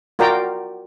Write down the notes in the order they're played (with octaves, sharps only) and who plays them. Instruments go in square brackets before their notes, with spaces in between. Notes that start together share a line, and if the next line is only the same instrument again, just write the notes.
[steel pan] F4 F#4 A#4 D5 G5 A#5